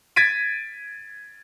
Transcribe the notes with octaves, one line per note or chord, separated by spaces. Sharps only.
G#6 A6 B6 D7 D#7